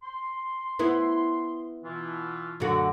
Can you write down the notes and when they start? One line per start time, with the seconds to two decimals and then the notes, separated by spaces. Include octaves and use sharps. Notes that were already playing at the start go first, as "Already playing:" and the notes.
0.03 C6
0.79 B3 E4
1.84 B2 E3 F4
2.60 F#2 D3 F#4